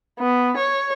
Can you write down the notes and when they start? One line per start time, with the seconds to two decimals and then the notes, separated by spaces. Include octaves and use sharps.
0.19 B3
0.57 C#5